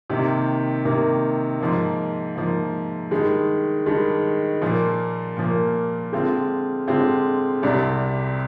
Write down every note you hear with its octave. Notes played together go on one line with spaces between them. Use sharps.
C3 D#3 A#3
C3 D#3 A#3
G#2 F3 A#3
G#2 F3 A#3
G2 D#3 G#3
G2 D#3 G#3
A#2 F3 A#3
A#2 F3 A#3
D3 G#3 C4 F4
D3 G#3 C4 F4
C2 C3 G3 D4